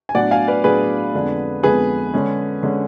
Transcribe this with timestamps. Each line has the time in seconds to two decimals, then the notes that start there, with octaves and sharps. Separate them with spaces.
0.09 G#5
0.15 A2 F#3 B3 D4 D5 F#5
0.31 F5 G#5
0.48 B4 D5
0.64 A2 F#3 B3 D4 G#4 B4
1.14 F2 D3 G#3 B3 D4
1.63 F2 D3 G#3 B3 D4 G#4 B4
2.14 D3 G#3 C#4
2.63 D3 G#3 C#4